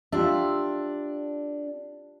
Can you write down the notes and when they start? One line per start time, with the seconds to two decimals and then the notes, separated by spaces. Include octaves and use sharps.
0.12 D4 F4 G4 E5